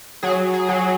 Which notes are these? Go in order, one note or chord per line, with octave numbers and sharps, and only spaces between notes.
F#3 G#4
G#4
F#3